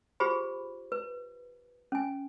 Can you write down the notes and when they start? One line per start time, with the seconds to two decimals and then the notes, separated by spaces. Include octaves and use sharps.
0.20 F4 G4 G#4 C5 B5
0.92 B4
1.92 C#4 G#5